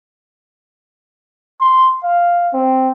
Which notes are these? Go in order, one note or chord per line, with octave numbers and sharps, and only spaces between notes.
C6
F5
C4